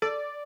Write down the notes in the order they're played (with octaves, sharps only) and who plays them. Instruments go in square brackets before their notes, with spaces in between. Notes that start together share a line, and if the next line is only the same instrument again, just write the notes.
[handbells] A4 [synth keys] D5